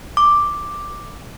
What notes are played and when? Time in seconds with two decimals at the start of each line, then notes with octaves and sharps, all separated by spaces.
0.17 D6